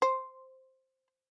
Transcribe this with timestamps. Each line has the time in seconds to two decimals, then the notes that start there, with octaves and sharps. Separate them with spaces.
0.02 C5